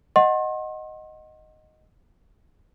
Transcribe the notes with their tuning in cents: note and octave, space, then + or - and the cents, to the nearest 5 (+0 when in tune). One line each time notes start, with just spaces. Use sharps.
D#5 +0 F#5 +0 C6 +40